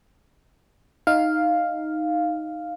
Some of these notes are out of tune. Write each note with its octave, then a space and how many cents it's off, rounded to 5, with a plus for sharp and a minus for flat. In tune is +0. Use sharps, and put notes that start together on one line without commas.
D#4 +0 F5 +0